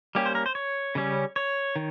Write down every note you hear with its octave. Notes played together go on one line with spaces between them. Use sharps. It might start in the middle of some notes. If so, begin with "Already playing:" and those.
G3 A#3 C#4 G4
C5
A#4
C5
C#5
C#3 G3 C#4
C#5
D#3